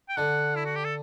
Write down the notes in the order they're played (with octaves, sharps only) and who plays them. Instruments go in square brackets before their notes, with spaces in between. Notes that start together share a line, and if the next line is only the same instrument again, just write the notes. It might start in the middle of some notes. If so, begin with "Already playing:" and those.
[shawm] G5
[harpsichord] D3 [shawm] F#5
[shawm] E4
F#4
G4
A4